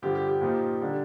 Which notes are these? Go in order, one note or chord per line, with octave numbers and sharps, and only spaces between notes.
G2 D3 F3 G4
G4
G4
A#2 F3 A#3 D#4
D3 G3 D4